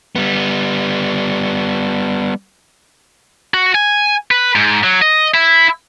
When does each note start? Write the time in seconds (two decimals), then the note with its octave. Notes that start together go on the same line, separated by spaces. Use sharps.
0.16 G3 B3
3.54 F#4
3.75 G#5
4.31 B4
4.55 G#2
4.84 F#3
5.02 D#5
5.34 E4